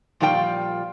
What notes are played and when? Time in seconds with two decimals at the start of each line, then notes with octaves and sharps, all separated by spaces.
0.20 A#2 F3 G3 F4 A#4 G5